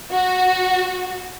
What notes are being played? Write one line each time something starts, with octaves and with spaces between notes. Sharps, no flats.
F#4